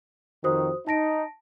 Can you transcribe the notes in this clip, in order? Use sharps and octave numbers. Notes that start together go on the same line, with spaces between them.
F2 D#3 F#4 C5 D#6
D#4 A5 A#6 D7